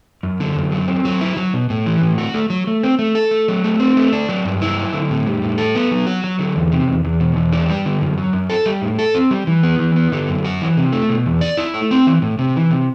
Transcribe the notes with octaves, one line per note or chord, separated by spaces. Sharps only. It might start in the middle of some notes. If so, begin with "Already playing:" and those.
F#2
D3
F#2
F#3
C4
F#3
E4
F#3
B2
A2
E3
A2
F#4
A3
F#3
A3
C4
A3
A4
A3
F#3
A3
C4
A3
D4
F#3
G2
E4
F#3
D3
A2
G3
A2
A4
B3
F#3
F#4
F#3
D3
E2
C3
E2
E2
B2
E2
D4
G3
D3
F#2
F#3
F#2
A4
G3
A2
A4
C4
G3
E3
B3
E3
B3
D3
F#2
F#4
E3
C3
A3
B2
E2
D5
E4
A3
C4
E3
A2
C3
E3
C3